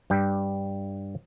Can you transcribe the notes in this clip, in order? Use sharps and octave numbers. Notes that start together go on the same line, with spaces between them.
G2 G3 G5